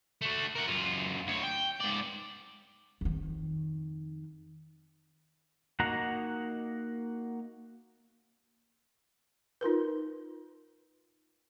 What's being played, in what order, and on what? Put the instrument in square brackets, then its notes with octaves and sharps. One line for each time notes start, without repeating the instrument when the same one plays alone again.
[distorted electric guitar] A3 F#4
A#4 F#5
F#2 F4
D2 C#5
G5
G#2 D5
[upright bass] F2 D#3
[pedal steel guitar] A#3 D#4 F#4 F#5 A#5
[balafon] D#4 F4 A#4 B4